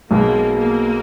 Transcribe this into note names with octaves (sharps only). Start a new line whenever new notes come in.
B1 B2 G#3 A#3
A#3